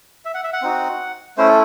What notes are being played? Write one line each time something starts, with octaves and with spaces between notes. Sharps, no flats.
E5
F#5
E5
F#5
C4 D#4 F#4
A3 C#4 E4 C5
A4